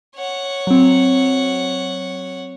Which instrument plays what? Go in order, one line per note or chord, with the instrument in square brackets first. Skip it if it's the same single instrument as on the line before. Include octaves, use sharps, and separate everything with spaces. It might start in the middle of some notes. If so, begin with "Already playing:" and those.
[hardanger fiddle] C#5 F#5
[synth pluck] F#3 C4